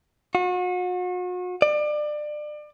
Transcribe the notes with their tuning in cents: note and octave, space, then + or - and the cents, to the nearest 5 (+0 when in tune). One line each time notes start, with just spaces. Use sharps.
F#4 -40
D5 +30